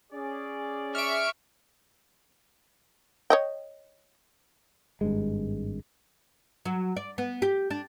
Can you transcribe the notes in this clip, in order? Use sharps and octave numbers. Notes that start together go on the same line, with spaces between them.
C#4 G#4 D5
E5 C#6 F6 D7
C#5 D#5 G5
G#1 G2 G#3
F#3
D5
B3
G4
D4